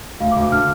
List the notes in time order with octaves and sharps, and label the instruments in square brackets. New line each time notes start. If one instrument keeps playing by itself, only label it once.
[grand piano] D2 [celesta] F5
[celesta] D6
[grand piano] D2
[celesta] D6
[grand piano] D3 [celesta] F6